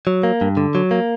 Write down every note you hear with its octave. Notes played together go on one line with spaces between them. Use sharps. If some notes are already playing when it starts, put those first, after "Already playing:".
F#3
A#3
G2
D3
F#3
A#3